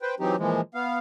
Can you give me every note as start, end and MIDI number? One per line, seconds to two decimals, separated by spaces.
0.02 0.15 71
0.02 0.15 72
0.02 0.15 79
0.20 0.36 52
0.20 0.36 54
0.20 0.36 60
0.20 0.36 63
0.20 0.36 67
0.38 0.61 46
0.38 0.61 52
0.38 0.61 53
0.38 0.61 56
0.74 0.99 59
0.74 0.99 77